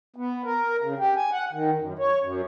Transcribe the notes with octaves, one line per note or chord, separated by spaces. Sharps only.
B3
A#4
C#3
G4
G#5
F#5
D#3
F#2
C#5
F#2